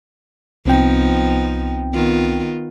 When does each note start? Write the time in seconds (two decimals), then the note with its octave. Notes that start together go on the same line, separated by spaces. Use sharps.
0.66 C2 F3 B3 C4 D#4 G5
1.93 D#3 B3 F4